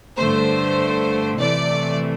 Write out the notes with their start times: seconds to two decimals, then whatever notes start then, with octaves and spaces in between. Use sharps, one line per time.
0.17 G2 D3 A3 C5
1.39 C3 E3 A3 D5